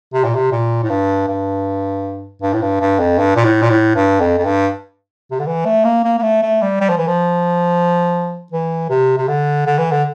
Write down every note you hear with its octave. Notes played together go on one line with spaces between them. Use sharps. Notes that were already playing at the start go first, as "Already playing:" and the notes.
C3
A#2
C3
A#2
A2
G2
G2
G2
A2
G2
G2
F2
G2
A#2
A2
A#2
A2
G2
F2
F2
G2
C3
D3
E3
A3
A#3
A#3
A#3
A3
A3
G3
G3
F3
E3
F3
E3
C3
C3
D3
D3
E3
D3